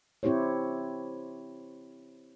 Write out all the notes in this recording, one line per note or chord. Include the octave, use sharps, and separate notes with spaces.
C4 E4 G4 C5 C#5